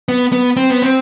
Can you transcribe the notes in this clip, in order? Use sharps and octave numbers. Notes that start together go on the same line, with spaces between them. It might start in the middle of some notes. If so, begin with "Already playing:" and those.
B3
B3
C4
B3
C4